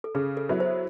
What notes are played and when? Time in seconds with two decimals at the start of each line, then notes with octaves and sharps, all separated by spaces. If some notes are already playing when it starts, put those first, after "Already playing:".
0.04 A4
0.15 C#3 G#4
0.37 A4
0.49 F#3 B3 E4
0.60 C5